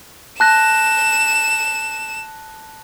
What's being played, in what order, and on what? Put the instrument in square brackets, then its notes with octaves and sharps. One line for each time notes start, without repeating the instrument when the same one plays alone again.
[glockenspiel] A5 F#6 A#6 [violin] E7